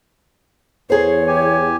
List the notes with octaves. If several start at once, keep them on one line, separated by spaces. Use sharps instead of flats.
E2 G#4 C5 C#5
G4 G#5